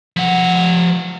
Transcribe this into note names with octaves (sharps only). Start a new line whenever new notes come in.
F3 F#5